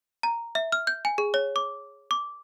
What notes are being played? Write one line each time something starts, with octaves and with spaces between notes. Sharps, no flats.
A#5
E5
F6
G6
G#5
G#4
C#5
D6
D6